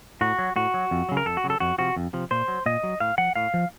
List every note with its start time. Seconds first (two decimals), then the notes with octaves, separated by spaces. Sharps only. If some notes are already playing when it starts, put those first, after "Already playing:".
0.21 A2 F#4
0.39 F#3
0.56 A2 F#4
0.74 F#3
0.91 F2
1.09 C#3 F#3
1.17 A#4
1.26 F2 A4
1.37 F#4
1.44 C#3 F#3
1.50 A4
1.60 F2 F#4
1.78 C3 F3 F#4
1.96 F2
2.13 C3 F3
2.31 A#2 C5
2.48 F#3
2.66 A#2 D#5
2.83 F#3
3.00 A2 F5
3.18 F3 F#5
3.35 A2 F5
3.54 F3